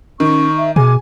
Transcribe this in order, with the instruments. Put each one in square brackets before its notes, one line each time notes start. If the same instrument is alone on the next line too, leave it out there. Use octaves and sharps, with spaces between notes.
[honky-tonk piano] D#3 [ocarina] C#4 [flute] C#6
[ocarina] E5
[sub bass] B2 [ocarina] G#4 [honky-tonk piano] G#5 [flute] D6